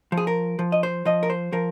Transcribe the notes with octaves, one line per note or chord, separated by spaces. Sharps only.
F3
G#4
A#4
F3
D#5
C5
F3 D#5
A#4
C5
F3 A#4